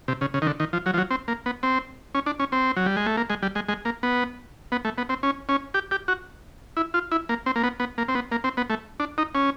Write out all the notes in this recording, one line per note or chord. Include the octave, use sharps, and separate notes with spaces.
C3
C#3
C#3
D#3
D3
D#3
F3
F#3
F3
F#3
C4
A#3
B3
C4
C#4
D4
C#4
C4
F#3
G3
G#3
A3
A#3
G#3
G3
G#3
G#3
A#3
B3
B3
A3
B3
C4
C#4
C#4
G4
G4
F#4
E4
F4
E4
A#3
C4
A#3
B3
B3
A#3
C4
B3
A#3
C4
B3
A3
D4
D#4
C#4